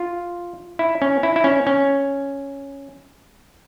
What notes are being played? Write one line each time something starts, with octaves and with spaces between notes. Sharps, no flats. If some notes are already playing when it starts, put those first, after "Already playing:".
Already playing: F4
E4
C#4
E4
E4
C#4
C#4